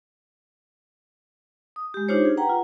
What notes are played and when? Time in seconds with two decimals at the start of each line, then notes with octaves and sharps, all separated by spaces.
1.76 D#6
1.94 G#3 G4
2.09 D4 D#4 F4 G4 C5 C#5
2.25 G#4
2.37 B4 F#5 G5 A#5
2.50 F4